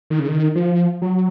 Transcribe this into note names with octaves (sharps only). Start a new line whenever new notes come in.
D#3
C#3
D#3
F3
F#3